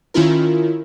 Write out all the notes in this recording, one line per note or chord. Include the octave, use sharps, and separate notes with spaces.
D#3 C#4 E4 F4 A#4